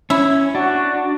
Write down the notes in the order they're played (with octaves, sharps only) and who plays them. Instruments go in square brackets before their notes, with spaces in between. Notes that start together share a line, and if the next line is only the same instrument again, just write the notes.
[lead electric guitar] C#4 [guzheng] E4
[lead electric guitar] D4 [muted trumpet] F#4